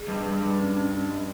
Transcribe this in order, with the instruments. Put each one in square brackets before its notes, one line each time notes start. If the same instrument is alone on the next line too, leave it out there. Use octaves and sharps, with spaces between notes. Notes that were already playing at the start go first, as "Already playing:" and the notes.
Already playing: [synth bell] G#4
[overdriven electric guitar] G2 [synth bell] G3
[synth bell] G3
G3
C#4
C#4
C#4
G3